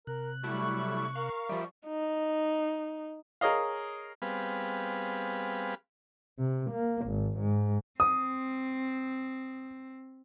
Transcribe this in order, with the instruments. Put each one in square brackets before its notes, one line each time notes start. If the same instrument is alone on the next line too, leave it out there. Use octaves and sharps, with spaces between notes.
[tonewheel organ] C3 F#6 [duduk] A#4
[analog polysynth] F#3 A3 E4 [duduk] G3 [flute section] C#6
[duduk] A#4 [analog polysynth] F5
[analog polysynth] F3 G3 [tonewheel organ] E5 B5 D6
[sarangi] D#4
[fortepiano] G#4 A#4 C#5 D#5 F5
[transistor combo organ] G3 B3 C4 G#4 B4 F5
[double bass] C3
A#3
G#1
G#2
[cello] C4 [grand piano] D#6